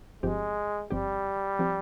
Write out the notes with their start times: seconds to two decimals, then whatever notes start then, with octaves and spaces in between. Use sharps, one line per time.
0.23 G1 G2 F3 G#3 C4 G4
0.91 G1 G2 F3 G3 C4 G4
1.59 F3 C4 G4